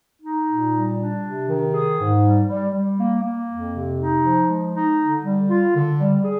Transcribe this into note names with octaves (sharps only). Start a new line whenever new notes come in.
D#4
A#2
G3
D4
C3
D#3
G#4
G#2
G3
G3
G3
A#3
A#3
F2
C3
D#4
F3
G#3
D#4
D3
G3
F4
D3
G3
G#4